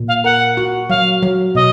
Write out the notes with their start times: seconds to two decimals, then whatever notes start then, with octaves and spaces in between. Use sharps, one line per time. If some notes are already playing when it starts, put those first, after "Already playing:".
Already playing: A#2
0.08 F5
0.24 A#4 F#5
0.57 F#4
0.90 F#3 F5
1.23 F#3
1.55 B2 D#5